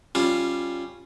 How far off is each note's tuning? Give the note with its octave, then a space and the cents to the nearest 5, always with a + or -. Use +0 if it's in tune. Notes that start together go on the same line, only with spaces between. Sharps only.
G3 +0 C#4 +0 F4 +0